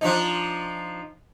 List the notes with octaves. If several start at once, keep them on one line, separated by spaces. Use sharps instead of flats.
F3 D4 D#4